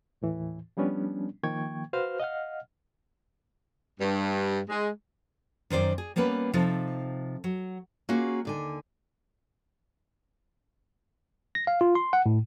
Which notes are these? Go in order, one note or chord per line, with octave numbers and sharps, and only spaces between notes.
D#2 A2 E3
F3 G3 B3 C#4 D4
D#3 F3 A#3 G5 C#6 G#6
F#4 B4 C5 F5 F6
D#5 F5 F#5 F6
G2
G#3
F#2 D#3 C5 D5
G#4
G3 A#3 B3 C#4 B4
C3 F3 D#4 A4
F#3
A#3 C#4 F4 F#4 G#4
D#2 D3 G#5
A#6
F5
F4
C6
F#5
A2